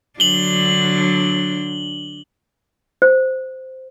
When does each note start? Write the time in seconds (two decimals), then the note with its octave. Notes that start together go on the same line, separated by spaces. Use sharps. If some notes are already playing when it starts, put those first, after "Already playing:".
0.20 D3 F#3 D4 F#7 G7
3.02 C5